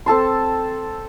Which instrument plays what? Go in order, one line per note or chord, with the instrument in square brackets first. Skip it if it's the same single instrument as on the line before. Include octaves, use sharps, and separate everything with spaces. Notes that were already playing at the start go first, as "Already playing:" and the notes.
[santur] C4 A4 A5 C6